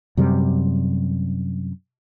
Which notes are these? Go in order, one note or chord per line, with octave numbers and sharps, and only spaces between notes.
F#2 C3 G3